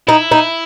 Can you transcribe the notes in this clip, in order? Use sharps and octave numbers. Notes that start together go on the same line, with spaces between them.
D#4 E4
D#4